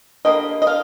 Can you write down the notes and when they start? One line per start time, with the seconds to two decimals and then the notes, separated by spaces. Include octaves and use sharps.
0.25 D3 G3 A#3 D#5
0.62 D#5
0.67 F5